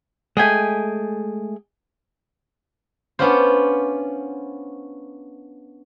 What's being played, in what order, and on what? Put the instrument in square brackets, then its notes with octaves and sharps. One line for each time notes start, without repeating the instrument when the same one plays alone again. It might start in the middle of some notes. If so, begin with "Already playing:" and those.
[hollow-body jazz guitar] G#3 A3 [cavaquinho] G#4 G5 G#5
[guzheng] B3 C#4 D4 F4 C5